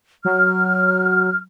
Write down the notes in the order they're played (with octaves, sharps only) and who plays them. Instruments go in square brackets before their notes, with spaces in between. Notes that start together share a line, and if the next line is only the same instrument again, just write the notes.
[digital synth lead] F#3 [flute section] F6